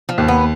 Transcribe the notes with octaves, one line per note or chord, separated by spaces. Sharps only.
F3
D#2
B3